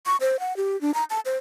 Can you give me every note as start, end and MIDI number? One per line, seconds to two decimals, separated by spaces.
0.06 0.17 85
0.21 0.40 72
0.40 0.56 78
0.57 0.79 67
0.81 0.94 62
0.94 1.04 82
1.10 1.20 81
1.26 1.36 72